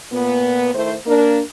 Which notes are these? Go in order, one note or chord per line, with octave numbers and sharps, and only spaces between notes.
A#2 B3
D#3 A3 E4 C5
A#3 D4 A#4